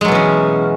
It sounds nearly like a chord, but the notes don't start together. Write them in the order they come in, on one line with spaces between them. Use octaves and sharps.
G#3 F#3 B2 E3 C#4